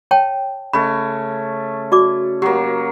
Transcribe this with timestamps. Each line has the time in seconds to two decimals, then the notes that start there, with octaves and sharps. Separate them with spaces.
0.11 C#5 G5 A5
0.73 C#3 A3 B5
1.92 F#4 D5 D6
2.42 F#3 A#3 G4